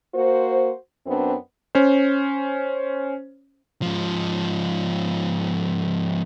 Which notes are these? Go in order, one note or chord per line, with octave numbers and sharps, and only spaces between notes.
A#3 F#4 C5
F#2 B3 C4 D4
C#4 C5
G#2 F3